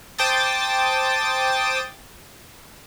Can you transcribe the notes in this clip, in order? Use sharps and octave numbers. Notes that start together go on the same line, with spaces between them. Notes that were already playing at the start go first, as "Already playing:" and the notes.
C5 G5 A5 D6 D#6 A6